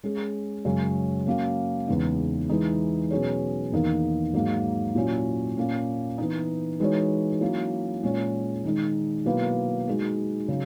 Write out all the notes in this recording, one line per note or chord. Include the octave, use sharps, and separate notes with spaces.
G#3 C#4 G#4
F#2 C#3 G#3 C#4
F#3 A#3 C#4
E2 C#3 G#3 B3 D#4
E3 G#3 D#4
B2 F#3 C#4 G#4 C#5
E2 D#3 A#3 D#4 A#4
G#2 F#3 A#3
A#2 F#3 C#4 E4
A#2 A#3 C#4
E3 B3 D#4
E3 G#3 D#4 F#4 C#5
F#3 A#3 C#4 E4
A#2 G#3 C#4 G#4 C#5
D#3 G#3 D#4
B2 F#3 A#3 E4 B4
G#3 D#4 F#4
C#3 F#3